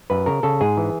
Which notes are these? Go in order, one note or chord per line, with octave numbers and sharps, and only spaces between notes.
F#2 B4
C#3 A#4
C#3 A4
G#2 G#4
E3